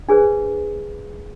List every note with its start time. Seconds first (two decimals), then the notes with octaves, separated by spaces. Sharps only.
0.09 D4 G#4 B4 C5